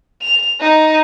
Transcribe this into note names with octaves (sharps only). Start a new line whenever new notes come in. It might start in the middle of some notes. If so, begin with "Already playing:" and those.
F7
D#4